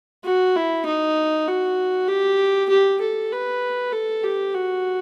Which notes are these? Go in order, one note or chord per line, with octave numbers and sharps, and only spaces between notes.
F#4
E4
D#4
F#4
G4
G4
A4
B4
A4
G4
F#4